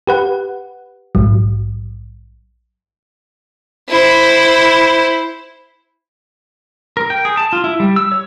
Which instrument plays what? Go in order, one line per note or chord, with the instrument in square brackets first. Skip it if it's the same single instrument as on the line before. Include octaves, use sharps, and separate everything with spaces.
[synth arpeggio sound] G4 B4 F#5
A#1 G#2 F#3
[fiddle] E4 C5
[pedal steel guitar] A#4
G5
G#4
A5
F4
E4
G3
E6
C#5